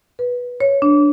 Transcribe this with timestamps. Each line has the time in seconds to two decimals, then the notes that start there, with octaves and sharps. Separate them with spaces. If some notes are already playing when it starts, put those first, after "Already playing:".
0.19 B4
0.60 C#5
0.82 D4